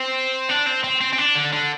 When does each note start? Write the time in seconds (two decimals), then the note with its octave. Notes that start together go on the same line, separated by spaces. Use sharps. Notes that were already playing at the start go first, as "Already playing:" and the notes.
Already playing: C4
0.50 D4
0.67 C4
0.84 C4
1.01 C4
1.13 C4
1.18 D4
1.36 D3
1.53 D3